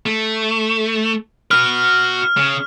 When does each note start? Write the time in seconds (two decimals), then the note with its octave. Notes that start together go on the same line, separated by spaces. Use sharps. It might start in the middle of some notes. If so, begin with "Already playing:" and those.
0.06 A3
1.51 F#4 B4 F6
2.37 C#3